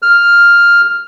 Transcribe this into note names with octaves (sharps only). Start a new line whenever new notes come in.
F6